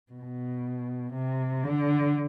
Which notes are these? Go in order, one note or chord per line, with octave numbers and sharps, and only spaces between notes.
B2
C3
D3